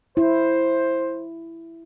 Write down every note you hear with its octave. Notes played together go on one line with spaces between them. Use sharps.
E4 C5